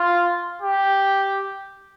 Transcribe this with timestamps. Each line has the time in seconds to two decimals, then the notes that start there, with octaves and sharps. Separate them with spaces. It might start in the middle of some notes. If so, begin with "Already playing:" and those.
Already playing: F4
0.62 G4